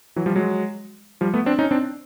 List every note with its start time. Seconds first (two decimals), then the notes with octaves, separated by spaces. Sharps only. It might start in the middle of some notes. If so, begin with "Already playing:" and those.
0.16 E3 F#3
0.26 F3 G3
0.36 F#3 G#3
1.21 F3 G3
1.34 A3 B3
1.46 C4 D4
1.59 C#4 D#4
1.71 C4 D4